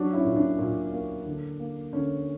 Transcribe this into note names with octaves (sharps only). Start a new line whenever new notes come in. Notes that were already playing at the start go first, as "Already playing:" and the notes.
Already playing: F#3 D4 F#4
C#4 E4
A#2
D4
A#2
A#3
D3
A#3
D3 C#4